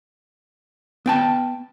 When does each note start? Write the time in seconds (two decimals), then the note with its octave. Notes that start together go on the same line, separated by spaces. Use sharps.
1.06 B3 G5 A5